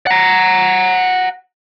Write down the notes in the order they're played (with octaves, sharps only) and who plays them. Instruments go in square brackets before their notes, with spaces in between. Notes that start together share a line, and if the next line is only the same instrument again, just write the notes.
[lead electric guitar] F#5 A#5